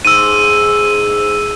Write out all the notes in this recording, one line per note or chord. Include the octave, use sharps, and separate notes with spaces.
G#2 E6 D#7